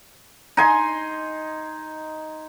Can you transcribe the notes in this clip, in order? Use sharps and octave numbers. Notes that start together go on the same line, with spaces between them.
D#4 G#5 C6